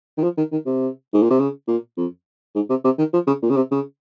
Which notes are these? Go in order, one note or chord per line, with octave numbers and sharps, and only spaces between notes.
D#3
F3
D#3
D#3
C3
G#2
A#2
C3
C#3
A#2
F2
G#2
C3
C3
D#3
F3
C#3
A#2
C#3
C3
C#3